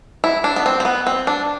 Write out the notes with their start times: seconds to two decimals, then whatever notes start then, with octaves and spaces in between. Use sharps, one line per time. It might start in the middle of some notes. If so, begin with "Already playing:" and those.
0.24 E4
0.44 D4
0.56 B3
0.66 C4
0.80 C4
0.85 B3
1.07 C4
1.27 D4